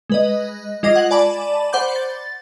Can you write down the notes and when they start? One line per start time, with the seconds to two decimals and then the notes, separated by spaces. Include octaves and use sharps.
0.10 G#3 B4 D#5
0.83 G#3 F4 D#5 D6 A#6 C7
0.95 F#5 G#6 F#7
1.11 D5 G#5 A5 B5 D6
1.73 C5 F#5 B5 D6 G6
1.96 A6